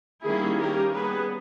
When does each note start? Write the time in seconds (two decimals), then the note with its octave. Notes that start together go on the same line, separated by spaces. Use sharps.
0.24 D#3 G3 A#3 C#4 E4 G#4
0.59 G3 A#3 C#4 G4 A#4
0.93 G3 B3 G#4 B4